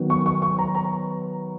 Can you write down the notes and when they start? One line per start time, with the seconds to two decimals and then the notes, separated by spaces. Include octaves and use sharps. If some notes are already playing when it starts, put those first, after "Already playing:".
Already playing: D#3 F#3 B3
0.10 C#6
0.26 C#6
0.42 C#6
0.59 A#5
0.75 A#5